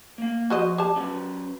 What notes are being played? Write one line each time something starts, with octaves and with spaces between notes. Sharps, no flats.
A#3 F5
F3 F#4 C5 D#5
G4 A5
F#3 C#4 B4